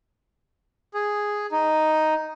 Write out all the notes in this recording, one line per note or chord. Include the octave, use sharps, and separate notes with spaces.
G#4
D#4